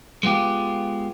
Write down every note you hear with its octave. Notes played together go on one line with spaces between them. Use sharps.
G#3 B3 F4 G4